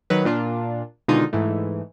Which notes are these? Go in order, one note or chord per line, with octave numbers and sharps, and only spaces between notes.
D#3 F#3 B4
A#2 D4 F4
B2 D3 D#3 G#3 D#4 F4
G#2 E3 A3